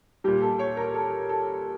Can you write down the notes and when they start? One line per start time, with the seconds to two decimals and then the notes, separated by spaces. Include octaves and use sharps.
0.24 A#2 G3 G4
0.41 A4
0.59 C#5
0.77 A#4
0.94 A4
1.29 A4